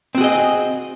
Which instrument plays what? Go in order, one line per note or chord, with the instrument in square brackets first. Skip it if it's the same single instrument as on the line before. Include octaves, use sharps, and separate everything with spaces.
[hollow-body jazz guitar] C4
F#4
G#4
D#5